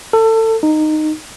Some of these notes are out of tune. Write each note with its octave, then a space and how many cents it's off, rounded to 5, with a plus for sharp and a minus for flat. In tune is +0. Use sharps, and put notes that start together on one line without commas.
A4 +25
D#4 -15